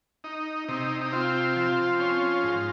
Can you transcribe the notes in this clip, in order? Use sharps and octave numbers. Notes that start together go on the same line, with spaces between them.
D#4
C3 D#4
D#4
C4 F4
F3
C#4
G#2